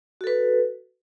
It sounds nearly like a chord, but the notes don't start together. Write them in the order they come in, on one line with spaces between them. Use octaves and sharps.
F#4 A4 B4